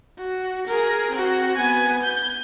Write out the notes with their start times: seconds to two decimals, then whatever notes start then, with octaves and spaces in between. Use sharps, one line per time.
0.19 F#4
0.67 G#4 A#4
1.11 C4 F#4
1.57 B3 G#5
2.03 G6